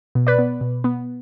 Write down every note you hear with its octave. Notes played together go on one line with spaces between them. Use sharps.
B2
B4 D5
B3
B2
B3